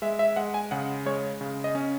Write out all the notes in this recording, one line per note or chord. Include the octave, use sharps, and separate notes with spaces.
G#3 E5
E5
G#3 F#5
G#5
C#3 F#5
G#3 C#5
C#3
D#5
C#4